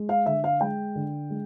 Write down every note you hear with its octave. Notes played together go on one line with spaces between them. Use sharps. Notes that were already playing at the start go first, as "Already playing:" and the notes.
Already playing: G#3
F5
D3 E5
F5
G#3 G5
D3
G#3